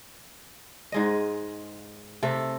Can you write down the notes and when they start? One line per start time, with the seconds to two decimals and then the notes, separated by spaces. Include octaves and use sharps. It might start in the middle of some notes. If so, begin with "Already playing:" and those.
0.92 G#2 G#3 D#5
2.23 C3 A3 A4